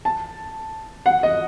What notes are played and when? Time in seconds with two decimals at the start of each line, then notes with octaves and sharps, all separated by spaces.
0.05 A5
1.06 F#5
1.23 D#5